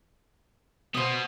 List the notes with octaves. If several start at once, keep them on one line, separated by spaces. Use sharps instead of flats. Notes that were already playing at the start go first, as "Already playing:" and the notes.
B3 F#4 C5 D#6